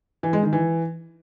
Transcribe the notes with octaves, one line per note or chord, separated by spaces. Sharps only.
E3
G#3
D#3
E3